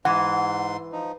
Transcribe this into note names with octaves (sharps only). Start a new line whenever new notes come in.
G#2 E3 F#5 C6
F3 D#4